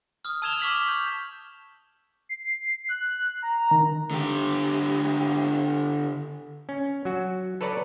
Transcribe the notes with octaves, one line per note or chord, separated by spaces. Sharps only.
D#6 F6
A5 E6 G#6 E7 F7 G7
C#6 D6 F6 B6 E7 F#7
G6
C7
F#6
A#5
D#3
D3 G4
C#4
F#3 F#4
A4 B4 C#5 D5 A5 A#5